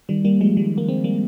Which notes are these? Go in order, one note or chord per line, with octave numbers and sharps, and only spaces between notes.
D#3 G3
G3 A#3
F3 G#3
D#3 G3
A#3
G#3 C4
G3 A#3